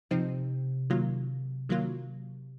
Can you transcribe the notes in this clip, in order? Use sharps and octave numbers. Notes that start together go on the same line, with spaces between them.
C3 F3 C4 D#4
D#3 F#3 A#3 F4
D#3 F#3 A#3 F4